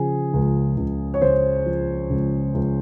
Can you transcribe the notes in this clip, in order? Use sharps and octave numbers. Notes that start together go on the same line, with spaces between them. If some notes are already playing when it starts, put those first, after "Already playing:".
Already playing: C#3 F3 G#4
C#2
C#2
C#5
C#3 C5
F3
C#2
C#2